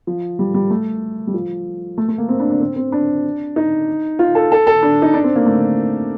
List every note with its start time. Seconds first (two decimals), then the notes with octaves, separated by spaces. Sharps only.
0.07 F3
0.39 G3
0.54 G3
0.70 A3
1.27 G3
1.34 F3
1.98 A3
2.08 A3
2.18 A#3
2.29 C4
2.40 D4
2.50 D4
2.60 C4
2.76 C4
2.92 D4
3.56 D#4
4.19 F4
4.35 A4
4.52 A4
4.67 A4
4.83 D4
5.02 D#4
5.14 D4
5.24 C4
5.36 A#3
5.46 A3